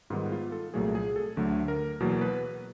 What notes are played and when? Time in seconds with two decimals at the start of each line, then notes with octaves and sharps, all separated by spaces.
0.10 G#2 D#3 G3 B3 F4
0.32 F4
0.52 A4
0.74 C2 A#2 F#3 A3 G#4
0.95 G#4
1.16 A4
1.37 D2 D3 F#3 A3
1.68 A#4
2.00 E2 B2 F#3 A#3
2.21 B4